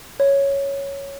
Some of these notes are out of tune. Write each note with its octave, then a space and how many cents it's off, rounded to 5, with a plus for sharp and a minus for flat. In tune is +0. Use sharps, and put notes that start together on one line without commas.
C#5 +0